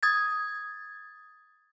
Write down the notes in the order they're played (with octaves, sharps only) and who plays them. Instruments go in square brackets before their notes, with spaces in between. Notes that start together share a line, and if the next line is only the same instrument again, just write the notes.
[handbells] D#6 G#6 A6